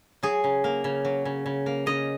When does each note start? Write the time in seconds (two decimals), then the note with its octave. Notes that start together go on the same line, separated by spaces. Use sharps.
0.23 F#3 G#4
0.44 C#3
0.64 A#3
0.84 C#3
1.05 F#3
1.25 C#3
1.46 C#3
1.66 A#3
1.86 C#3 D#5